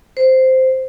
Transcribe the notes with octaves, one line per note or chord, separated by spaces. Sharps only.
C5